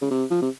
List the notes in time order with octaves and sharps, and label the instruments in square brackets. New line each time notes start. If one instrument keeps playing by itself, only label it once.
[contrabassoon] C#3
C3
F3
C3